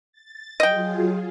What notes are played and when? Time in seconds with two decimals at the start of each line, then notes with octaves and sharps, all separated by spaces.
0.12 A6
0.60 F#3 F4 G#4 D#5 G5